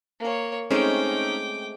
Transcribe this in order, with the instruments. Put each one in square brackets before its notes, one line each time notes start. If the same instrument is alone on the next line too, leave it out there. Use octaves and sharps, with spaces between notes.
[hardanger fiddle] A#3 C#5
[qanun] G#3 A3 C4 [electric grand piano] C#4 D#4 [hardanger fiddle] G5 D6